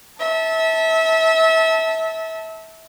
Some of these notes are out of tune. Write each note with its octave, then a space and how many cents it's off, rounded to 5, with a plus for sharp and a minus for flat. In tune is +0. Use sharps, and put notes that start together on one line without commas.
E5 -30 A5 +0